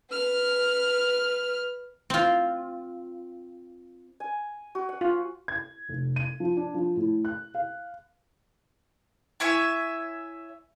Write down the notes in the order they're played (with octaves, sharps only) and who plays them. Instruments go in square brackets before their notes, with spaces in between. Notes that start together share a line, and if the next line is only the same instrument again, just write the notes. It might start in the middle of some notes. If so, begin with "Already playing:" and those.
[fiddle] B4 F6
[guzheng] C4 F4
[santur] G#5
F#4
F#5
[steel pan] F4
[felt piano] G#6
F1
D#7
F3
D4
F3
A2
F#6
F5
[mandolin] E4 C#5 E5 G#5